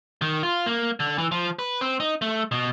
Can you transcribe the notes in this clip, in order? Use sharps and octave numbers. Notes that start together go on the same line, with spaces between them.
D#3
F4
A#3
D3
E3
F3
B4
C4
D#4
A3
B2